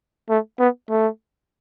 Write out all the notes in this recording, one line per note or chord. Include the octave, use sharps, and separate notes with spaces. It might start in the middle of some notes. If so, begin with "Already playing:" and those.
A3
B3
A3